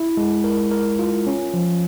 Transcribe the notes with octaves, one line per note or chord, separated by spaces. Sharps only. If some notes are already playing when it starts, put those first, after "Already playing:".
Already playing: E4
G#3
A#4
A#4
F4
C#4
F3